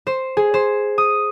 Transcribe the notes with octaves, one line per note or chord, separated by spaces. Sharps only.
C5
G#4
C5
D#6